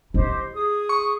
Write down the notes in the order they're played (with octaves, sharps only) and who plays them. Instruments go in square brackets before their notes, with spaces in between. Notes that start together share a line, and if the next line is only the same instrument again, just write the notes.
[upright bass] E4 [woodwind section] G4 C5 D#5
[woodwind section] G#4 D#6
[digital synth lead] C#6